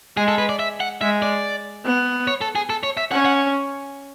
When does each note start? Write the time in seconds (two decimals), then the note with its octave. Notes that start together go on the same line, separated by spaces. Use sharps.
0.17 G#3 G#4
0.28 A4
0.38 B4
0.49 D5
0.59 E5
0.80 F#5
1.01 G#3 E5
1.22 D5
1.85 B3
2.27 C#5
2.41 A4
2.55 G#4
2.70 A4
2.83 C#5
2.97 E5
3.12 C#4 F#5
3.25 F#5